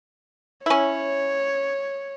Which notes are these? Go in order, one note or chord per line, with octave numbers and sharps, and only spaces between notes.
C#4 E4 C#5